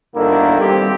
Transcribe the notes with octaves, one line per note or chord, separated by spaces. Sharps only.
G1 D3 D#3 A#3 E4
G3 C4 G4